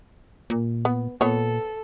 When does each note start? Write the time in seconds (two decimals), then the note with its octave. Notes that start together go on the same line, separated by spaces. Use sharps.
0.50 A#2
0.85 B3
1.21 A#2 B3 A4 C#5